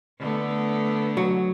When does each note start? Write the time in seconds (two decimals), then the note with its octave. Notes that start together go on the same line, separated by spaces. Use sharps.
0.19 D3 A3 B3
1.17 F#3